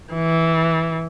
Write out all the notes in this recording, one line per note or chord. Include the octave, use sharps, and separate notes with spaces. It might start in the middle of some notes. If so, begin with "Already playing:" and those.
E3